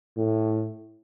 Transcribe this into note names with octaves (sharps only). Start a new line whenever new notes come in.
A2